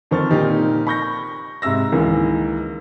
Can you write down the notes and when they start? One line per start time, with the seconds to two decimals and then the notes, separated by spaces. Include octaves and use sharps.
0.11 F2 D#3 C5 C#6 F6 A6
0.31 A#2 D#3 C4 D#4 G4
0.87 B5 C#6 G6 A#6
1.62 G#2 C3 E5 E6 A#6
1.92 C#2 D#3 E3 A#3